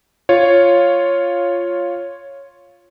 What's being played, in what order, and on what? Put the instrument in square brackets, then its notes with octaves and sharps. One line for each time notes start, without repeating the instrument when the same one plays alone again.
[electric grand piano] F4 C#5